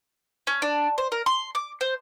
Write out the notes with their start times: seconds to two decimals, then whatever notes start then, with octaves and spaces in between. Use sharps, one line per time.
0.47 C#4
0.62 D4
0.98 C5
1.12 A#4
1.26 C6
1.55 D6
1.81 C5